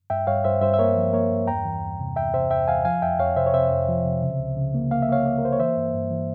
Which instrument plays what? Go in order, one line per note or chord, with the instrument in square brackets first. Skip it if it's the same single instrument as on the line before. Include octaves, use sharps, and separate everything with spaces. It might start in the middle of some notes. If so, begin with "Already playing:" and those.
[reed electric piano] G2 E5 G5
G2 C#5 F5
G2 C5 E5
G2 C5 E5
E5
A#3 A#4 C#5
F3
A#3 A#4 C#5
G2
E2 G5 A#5
E3
E2
C3
E2 E5 G5
C3 C5 E5
E2 E5 G5
E2 F5 G#5
F3 F5 G#5
F2 E5 G5
F2 C#5 F5
C3 C5 E5
C#5
C3 C5 E5
F2
F3
C3
C#3
C#2
C#3
A#3
A#3 F5
E5
A#3 C#5 F5
A#3
A#4
A#3 C5
C#5
E3 C5 E5
G2
G2
E3